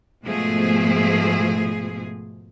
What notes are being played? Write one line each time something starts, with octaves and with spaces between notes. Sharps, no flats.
G#2 B2 F3 A3 G#4